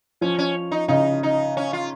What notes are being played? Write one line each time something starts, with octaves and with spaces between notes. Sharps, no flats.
F3 C#4
C#4
D#4
C#3 D#4
D#4
C#4
F4